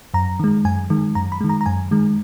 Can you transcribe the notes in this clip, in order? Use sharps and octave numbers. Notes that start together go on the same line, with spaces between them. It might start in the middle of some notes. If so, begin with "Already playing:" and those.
F#2 A#5
D#3 G#3
F#2 G#5
D#3 G#3
F#2 A#5
B5
D#3 G#3
A#5
A#5
F#2 G#5
D#3 G#3